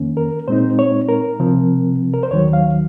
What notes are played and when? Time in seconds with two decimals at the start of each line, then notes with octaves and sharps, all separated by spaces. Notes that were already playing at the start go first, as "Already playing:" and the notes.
Already playing: F2 D#3 A#3 C#4
0.17 A#4
0.48 A#2 G#3 C4 D#4 C5
0.79 C#5
1.09 A#4
1.40 C2 C3 F3 C4
2.14 A#4
2.23 C5
2.31 D#2 D#3 F#3 C#5
2.53 F5